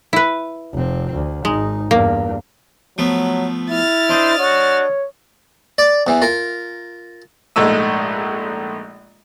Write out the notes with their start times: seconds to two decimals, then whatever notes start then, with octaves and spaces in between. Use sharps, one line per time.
0.13 E4 B4
0.73 F1 C4
1.14 D2
1.45 G#1 G#3 D#4
1.91 E2 G2 A#3
2.98 F3 F#3 A3 B3
3.70 E4 F6 A6
4.09 D4 C5 D#5
4.39 F#4 C#5
5.78 D5
6.07 E2 E3
6.22 F4 A#4
7.56 A#1 G#2 G#3 A3 E6